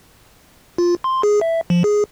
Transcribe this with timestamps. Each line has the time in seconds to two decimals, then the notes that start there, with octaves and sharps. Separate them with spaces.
0.78 F4
1.04 C6
1.23 G#4
1.41 E5
1.70 F3
1.84 G#4